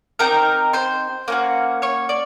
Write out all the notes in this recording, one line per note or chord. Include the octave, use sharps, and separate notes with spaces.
C4 D#4 G4 A#4 A#5
C5 C6
A#3 C#4 F#4
C#5 C#6
D5